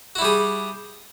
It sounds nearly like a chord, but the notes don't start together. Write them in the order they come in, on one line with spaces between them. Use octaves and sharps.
F#4 E4 G3 G#4